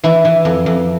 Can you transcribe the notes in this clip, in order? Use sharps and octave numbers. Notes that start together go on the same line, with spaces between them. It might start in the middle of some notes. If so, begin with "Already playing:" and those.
E3 E4
E3
F2
F2